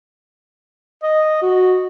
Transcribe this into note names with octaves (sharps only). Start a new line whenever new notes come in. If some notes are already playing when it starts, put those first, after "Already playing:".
D#5
F#4